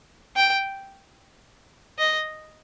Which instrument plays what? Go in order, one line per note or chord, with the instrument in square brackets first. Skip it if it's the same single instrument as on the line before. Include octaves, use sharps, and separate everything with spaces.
[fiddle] G5
D#5